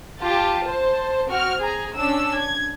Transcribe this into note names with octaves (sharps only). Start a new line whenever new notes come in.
F4 G4 A5
C5 A5
C4 F#4 F6
G#4 A#5
C#4 D4 E6
G#6